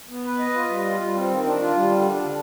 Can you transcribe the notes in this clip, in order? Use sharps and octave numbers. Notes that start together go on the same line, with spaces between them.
B3
B4
D#5
F4
G3
F4
G3
C4
D#3
D4
F4
G3
D3
D4
D3